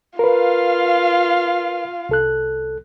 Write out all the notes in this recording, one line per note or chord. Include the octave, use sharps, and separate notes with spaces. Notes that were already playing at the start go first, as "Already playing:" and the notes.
F4 A#4 B4 F5
C2 A4 F#6